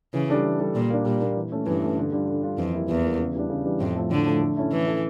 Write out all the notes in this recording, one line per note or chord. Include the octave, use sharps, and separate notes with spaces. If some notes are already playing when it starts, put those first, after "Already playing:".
C#3 E3
G3 D4 A4
E3
G3 D4 A4
A#2 G3
A#3 D4
A#2 G3
A#3 D4
E3
A3 C#4
G2 E3
A3 C#4
D3
G3 D4 F4
D3
G3 D4 F4
F2 E3
G3 A#3 E4
E2 E3
G3 A#3 E4
C#3
E3 G3 D4
C#3
E3 G3 D4
F2 A2
F3 A3
A2 D3
F3 A3
A3
C#4 E4 A4
E3 A3
C#4 E4 A4